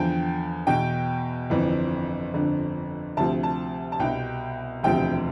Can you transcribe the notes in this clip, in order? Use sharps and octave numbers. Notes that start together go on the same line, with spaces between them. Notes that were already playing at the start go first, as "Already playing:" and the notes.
Already playing: E2 D3 F3 G5
E2 B2 G5
G1 F2 E3
G1 F2 D3
D2 C3 F3 A5
A5
A5
C2 B2 G5
E1 D2 C3 F3 G5